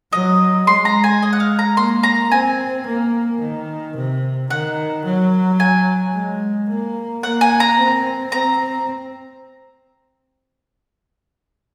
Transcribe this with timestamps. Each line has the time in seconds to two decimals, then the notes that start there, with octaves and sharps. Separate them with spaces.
0.12 F#3 D#5
0.67 G#3 C6
0.85 A#5
1.04 G#5
1.22 D#5
1.33 F#5
1.40 F5
1.59 A#5
1.76 A#3 C6
2.03 A#5
2.31 C4 G#5
2.86 A#3
3.41 D#3
3.96 C3
4.50 D#3 F#5
5.05 F#3
5.60 G#5
6.13 G#3
6.69 A#3
7.23 A#3 F#5
7.41 G#5
7.60 A#5
7.78 C4
8.32 C4 A#5